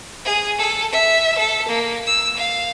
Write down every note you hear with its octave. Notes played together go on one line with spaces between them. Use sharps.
G#4
A4
E5
A4
A#3
E6
F5